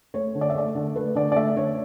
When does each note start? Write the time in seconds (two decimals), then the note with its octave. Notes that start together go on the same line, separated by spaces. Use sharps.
0.14 A3 C#5
0.35 D3
0.41 D5
0.50 E5
0.55 A3 D5
0.75 D3
0.96 A3 B4
1.15 D3 D5
1.32 D5
1.36 A3 E5
1.56 D3 C#5